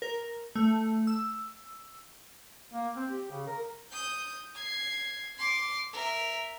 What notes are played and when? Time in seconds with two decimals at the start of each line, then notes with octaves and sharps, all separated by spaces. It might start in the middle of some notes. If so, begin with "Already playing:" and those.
0.02 A#4
0.55 A3
1.07 E6
2.72 A#3
2.96 C4
3.11 G4
3.31 C#3
3.47 A#4
3.92 D#6 G6
4.55 G#6 C7
5.38 C6 D6
5.93 A#4 E5